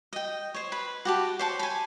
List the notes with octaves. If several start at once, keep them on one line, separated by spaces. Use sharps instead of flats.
D#5 G5
C5 C#5
B4 B5
F#4 G4 A5
C5 C#5 A5
G#5 B5